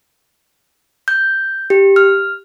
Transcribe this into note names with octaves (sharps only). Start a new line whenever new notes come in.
G6
G4
F6